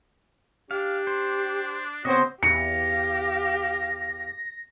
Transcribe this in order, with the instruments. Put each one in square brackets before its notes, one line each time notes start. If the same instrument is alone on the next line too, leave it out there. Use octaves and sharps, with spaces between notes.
[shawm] D4 [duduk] G4 [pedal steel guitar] F5
[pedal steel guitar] C5
[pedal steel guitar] C#3 D#5 [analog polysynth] B3 C4 C5 [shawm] F#4 [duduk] C#5
[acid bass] E2 [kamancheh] G4 F5 [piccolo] A#6 [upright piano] C#7